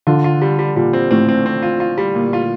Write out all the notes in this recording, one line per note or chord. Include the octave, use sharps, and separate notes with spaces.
D3 F4
F4
G3
G3
A#2 G3
C4
A2 C4
C4
C4
F4
F4
G3
A#2
F4